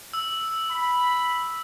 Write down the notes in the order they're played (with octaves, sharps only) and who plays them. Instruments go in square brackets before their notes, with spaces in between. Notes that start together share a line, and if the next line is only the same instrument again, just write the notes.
[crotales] E6
[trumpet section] B5